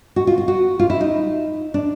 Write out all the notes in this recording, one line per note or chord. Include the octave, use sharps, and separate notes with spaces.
F#4
F4
F4
F#4
F4
E4
D#4
D4